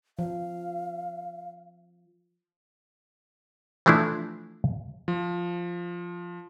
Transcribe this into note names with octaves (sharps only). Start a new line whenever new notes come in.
F3 F5
E3 F3 A3 D4 E4
F3